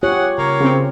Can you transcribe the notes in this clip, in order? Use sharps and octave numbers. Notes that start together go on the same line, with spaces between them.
F4 G4 G#4 C#5 F#5
C#3 A#3 C#5
C#3 C4 C#4